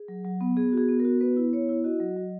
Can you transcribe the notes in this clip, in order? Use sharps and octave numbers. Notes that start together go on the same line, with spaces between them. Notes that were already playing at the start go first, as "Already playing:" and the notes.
Already playing: G#4
F#3
F#3
B3
B3 G#4
F#4
G#4
B3
A#4
F#4
B3 B4
E4
B3 C#5
E4
F#4 D#5
F#3
F#3